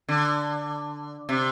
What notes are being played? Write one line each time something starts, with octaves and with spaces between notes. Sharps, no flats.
D3
C3